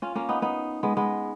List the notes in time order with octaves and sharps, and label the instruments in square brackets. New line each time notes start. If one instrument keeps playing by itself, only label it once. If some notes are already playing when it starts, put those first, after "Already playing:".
[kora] C#4 F4
A#3 C#4
B3 D#4
B3 D#4
G#3 B3
G#3 B3